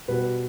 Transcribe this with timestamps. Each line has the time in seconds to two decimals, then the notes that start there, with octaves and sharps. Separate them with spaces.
0.08 B2 G3 B4